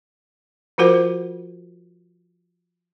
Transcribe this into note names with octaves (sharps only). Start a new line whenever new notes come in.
F3 F4 F#4 A#4 C5 F#5